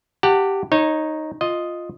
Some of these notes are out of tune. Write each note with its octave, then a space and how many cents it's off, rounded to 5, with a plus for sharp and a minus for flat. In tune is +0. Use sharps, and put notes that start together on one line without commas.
G4 -5 F#5 +0 A5 +35
D#4 +0 C#5 -20
F4 +0 D#5 +0